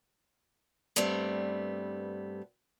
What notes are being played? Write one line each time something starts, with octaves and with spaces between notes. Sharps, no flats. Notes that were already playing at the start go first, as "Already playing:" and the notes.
G2 G3 A3 B3 C4